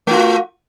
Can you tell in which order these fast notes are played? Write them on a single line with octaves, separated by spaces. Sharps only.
A3 F4 F#4